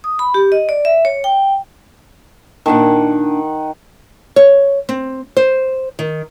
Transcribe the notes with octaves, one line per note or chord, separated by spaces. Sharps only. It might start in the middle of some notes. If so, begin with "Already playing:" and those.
D#6
B5
G4
D#5
D5
E5
C#5
G5
A#2 D#3 D4 F#5 A5
C#5
C4
C5
D#3